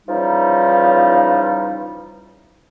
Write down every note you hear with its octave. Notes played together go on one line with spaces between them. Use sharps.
C#3 E3 F3 G3 D#4